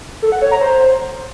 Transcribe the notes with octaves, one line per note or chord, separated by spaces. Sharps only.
A4
F#5
C#5
A#5
C5